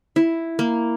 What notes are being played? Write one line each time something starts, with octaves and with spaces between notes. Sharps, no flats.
E4
A#3